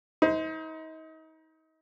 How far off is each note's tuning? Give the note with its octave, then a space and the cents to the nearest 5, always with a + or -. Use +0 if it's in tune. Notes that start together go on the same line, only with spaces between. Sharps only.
D#4 +35 C5 -20